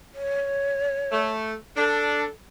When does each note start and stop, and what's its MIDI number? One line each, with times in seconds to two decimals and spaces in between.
0.14 1.30 73
1.12 1.53 57
1.77 2.24 62
1.77 2.27 69